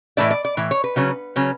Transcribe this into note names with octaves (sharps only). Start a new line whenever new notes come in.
A2 E3 A3 E4 D5
D5
D5
A2 E3
C#5
B4
C#3 F#3 C#4
C#3 F#3 C#4